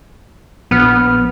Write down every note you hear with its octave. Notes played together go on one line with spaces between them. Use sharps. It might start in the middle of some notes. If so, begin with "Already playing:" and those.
A#1 B3 F6